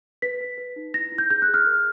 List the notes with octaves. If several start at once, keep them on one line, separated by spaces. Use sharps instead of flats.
B4 B6
B4
B4
D#4
E4 A#6
E4
G6
G#4 G6
F#6
G#4
F6
A#4